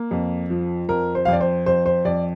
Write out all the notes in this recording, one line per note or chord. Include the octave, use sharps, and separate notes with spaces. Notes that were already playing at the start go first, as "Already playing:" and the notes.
Already playing: A#3
F2
F3
F2 A#4
C5
F5
F2 D5
C5
F2 C5
C5
F2 D5